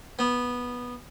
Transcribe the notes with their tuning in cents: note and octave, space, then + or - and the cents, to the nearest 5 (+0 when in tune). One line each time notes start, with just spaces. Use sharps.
B3 -10